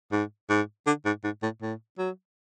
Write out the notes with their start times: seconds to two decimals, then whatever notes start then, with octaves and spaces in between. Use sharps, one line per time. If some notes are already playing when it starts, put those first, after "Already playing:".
0.12 G#2
0.50 G#2
0.87 D3
1.06 G#2
1.24 G#2
1.43 A2
1.62 A2
1.98 F#3